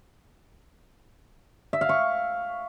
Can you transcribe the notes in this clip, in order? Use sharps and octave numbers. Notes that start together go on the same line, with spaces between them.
E5
F5
C#6